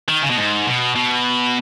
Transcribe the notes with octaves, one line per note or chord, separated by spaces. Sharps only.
D#3
C#3
B2
G#2
B2
B2